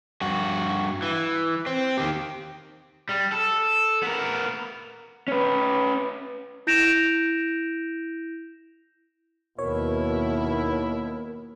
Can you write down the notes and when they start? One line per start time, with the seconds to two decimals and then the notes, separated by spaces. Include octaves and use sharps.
0.22 G2 F#4
1.02 E3
1.66 C4
1.98 D#3 G4
3.09 G3
3.32 A4
4.03 B3 A#4
5.28 C#4 B4
6.67 E4 G6 A#6 D7 E7 F7
9.59 D#2 B2 E4 A#4 C#5